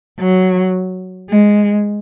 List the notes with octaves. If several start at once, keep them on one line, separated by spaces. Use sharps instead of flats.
F#3
G#3